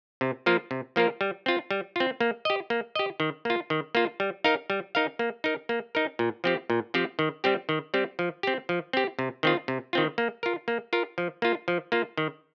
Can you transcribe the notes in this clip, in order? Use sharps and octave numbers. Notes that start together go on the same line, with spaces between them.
C3
F3 A#3 F4 A#4
C3
F3 A#3 F4 A#4
G3
C4 F4
G3
C4 F4
A#3
G4 D#5
A#3
G4 D#5
D#3
A#3 F4
D#3
A#3 F4
G3
D#4 A#4 F5
G3
D#4 A#4 F5
A#3
D#4 A#4
A#3
D#4 A#4
A#2
F3 C4 G4
A#2
F3 C4 G4
D#3
G3 C4 G4
D#3
G3 C4 G4
F3
C4 G4
F3
C4 G4
C3
D#3 C4 F4
C3
D#3 C4 F4
A#3
F4 A#4
A#3
F4 A#4
F3
A#3 F4
F3
A#3 F4
D#3